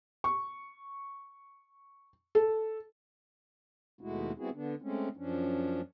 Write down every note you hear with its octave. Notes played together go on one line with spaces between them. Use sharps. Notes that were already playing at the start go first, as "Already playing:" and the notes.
C#6
A4
D#2 B2 G#3 A3 E4 F#4
G3 B3 C4 E4 F#4 G#4
D3 B3 D4
G#3 A3 C4 C#4
F#2 F3 C#4 D4